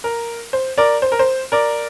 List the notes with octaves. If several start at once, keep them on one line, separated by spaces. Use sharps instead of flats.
A#4
C5
A#4 D5
C5
A#4
C5
A#4 D5